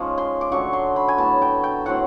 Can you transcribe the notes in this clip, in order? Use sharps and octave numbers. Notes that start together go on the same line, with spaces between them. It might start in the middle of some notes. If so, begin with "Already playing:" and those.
Already playing: F3 G#3 C#4 D#4
C6
D6
D3 F#3 A3 D4 C#6
C6
B5
G#5
A2 F#3 B3 A5
G5
G5
A2 F#3 A3 C4 F#5